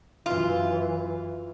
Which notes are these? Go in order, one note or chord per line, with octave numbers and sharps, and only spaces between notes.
F#2 E3 F4